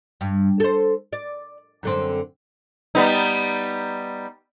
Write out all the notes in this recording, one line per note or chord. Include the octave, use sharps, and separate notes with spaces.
G2
A4 C5
D5
F#2 D3 C4
G3 B3 D#4